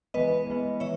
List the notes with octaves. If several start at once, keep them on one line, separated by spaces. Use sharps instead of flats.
E3 G#3 B3 B4 D#5
E3 G#3 B3
E3 C#5 E5